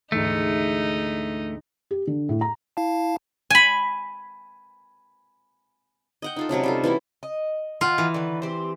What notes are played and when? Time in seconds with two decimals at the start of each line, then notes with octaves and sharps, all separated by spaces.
0.12 D2 G#2 E3 A3 D#4
1.91 G4
2.07 D3
2.29 A2
2.41 A#5
2.77 E4 F5 A5
3.50 G#5 B5
6.22 D#5 F#5 G5
6.36 D#4 F4 A4
6.49 C3 F#3 A3 C#4
6.63 G3 F4 A4
6.84 E3 C#4 E4 F#4
7.23 D#5
7.81 D#3 F4 F#5 G#5
7.98 E3
8.14 D3 D#3 B4
8.42 C4 G4 C5